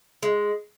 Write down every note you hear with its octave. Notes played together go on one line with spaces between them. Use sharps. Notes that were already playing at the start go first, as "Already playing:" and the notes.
G#3